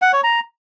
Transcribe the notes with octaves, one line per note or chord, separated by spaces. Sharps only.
F#5
C#5
A#5